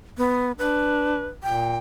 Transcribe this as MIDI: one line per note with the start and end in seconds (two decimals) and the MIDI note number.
0.18 0.52 59
0.59 1.27 62
0.59 1.26 71
1.43 1.77 46
1.43 1.78 79